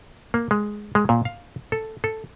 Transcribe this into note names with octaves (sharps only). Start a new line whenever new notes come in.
A#3
G#3
G#3
A#2
F5
A4
A4